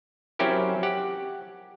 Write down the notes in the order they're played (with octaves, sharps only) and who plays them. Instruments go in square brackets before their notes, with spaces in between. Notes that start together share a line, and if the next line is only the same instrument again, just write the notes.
[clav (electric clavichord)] F#3 C4 C#4 E4 G4 A#4
G4 F#5